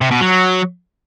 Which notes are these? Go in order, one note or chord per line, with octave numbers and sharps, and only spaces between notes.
C3
B2
F#3